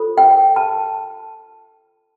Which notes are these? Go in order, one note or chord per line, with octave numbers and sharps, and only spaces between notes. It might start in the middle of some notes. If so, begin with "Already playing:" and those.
Already playing: F4 A4 C5
G5
A5